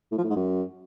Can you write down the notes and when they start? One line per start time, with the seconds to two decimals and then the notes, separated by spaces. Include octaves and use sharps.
0.11 A2
0.17 F3
0.23 A2
0.30 G#2
0.36 F#2